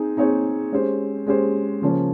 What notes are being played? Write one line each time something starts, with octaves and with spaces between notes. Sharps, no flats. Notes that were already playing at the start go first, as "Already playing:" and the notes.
Already playing: C4 D#4 G#4
C4 D#4 G#4 C#5
G#3 C#4 G4 C5
G#3 C#4 G4 C5
C#3 F3 A#3 C#4